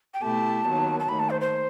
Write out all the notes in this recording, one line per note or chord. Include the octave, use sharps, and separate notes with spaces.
G5
B2 A3 E4 G4 A5
D#2 D#3 F#3 B3
A5
D#2 D#3 A3 B5
A5
C5
C5